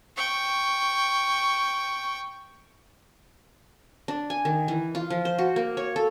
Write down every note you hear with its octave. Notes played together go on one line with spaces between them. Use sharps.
G5 C#6
D4
G#5
D#3
E3
F4
F3
C5
F#4
A#3
C#5
A4